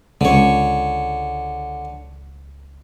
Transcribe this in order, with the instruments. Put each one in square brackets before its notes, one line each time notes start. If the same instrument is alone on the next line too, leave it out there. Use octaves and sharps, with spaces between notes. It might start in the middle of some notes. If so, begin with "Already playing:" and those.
[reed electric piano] C#2 [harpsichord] D3 C#5